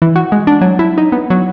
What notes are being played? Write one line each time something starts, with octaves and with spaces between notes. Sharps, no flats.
E3
F#4
G#3
D4
F#3
E4
D#4
B3
F#3